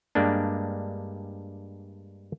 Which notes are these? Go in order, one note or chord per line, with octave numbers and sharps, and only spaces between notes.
G2 G3 G#3 A#3 D4